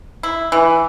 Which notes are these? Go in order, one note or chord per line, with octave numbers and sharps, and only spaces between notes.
E4
E3